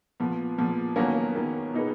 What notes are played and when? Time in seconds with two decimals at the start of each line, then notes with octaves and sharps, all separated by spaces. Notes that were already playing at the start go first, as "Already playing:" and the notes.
0.20 A#2 F3 B3
0.58 A#2 F3 B3
0.96 D#3 F#3 A#3 B3 C#4
1.35 D#3 F#3 B3
1.73 B2 A#3 D#4 G#4 B4